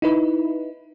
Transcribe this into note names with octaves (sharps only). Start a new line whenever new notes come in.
D#4 E4 B4